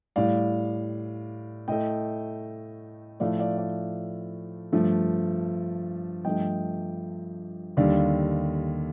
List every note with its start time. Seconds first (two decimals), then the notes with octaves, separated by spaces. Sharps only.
0.16 A2 G3 D5 F5
1.68 A2 A3 D#5 G5
3.20 A2 F3 A3 D5 F5
3.39 D5 F5
3.58 D5 F5
4.72 G2 F3 A3
6.24 G2 F3 A3 D#5 G5
7.77 D#2 D3 G3 D5 F5